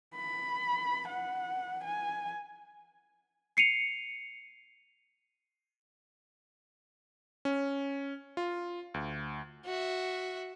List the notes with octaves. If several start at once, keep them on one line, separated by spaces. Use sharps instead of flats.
B5
F#5
G#5
C7 C#7 D#7 F7
C#4
F4
D2
F#4 E5